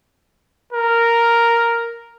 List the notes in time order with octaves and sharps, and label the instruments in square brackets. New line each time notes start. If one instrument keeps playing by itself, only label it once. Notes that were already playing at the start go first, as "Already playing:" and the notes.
[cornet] A#4